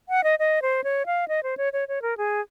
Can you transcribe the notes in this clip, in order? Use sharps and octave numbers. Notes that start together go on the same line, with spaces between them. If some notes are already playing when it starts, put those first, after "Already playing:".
F#5
D#5
D#5
C5
C#5
F5
D#5
C5
C#5
C#5
C#5
A#4
G#4